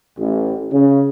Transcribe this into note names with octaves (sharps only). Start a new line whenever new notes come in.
A1
C#3